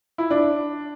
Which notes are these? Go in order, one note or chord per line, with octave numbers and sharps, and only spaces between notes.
E4
D4